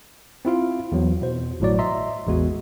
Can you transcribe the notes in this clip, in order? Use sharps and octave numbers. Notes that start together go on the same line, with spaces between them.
C4 E4 F4 F5
E2 F#3
B2 C5
G#1 A2 F#3 D5
D#5 E5 A#5 C6
A1 E2 G#3 B3 F#4